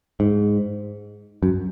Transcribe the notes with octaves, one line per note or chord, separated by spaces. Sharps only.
G#2
F#2